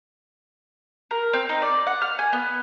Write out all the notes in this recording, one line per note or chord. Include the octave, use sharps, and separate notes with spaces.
A#4
C4
D#4
D5
F#5
F6
G#5
B3